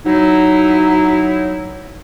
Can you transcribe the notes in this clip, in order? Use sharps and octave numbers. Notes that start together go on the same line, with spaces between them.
F#3 D#4 E4